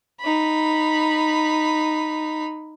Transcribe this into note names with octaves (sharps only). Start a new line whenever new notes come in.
D#4 B5